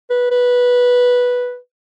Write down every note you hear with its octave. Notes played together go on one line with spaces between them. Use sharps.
B4
B4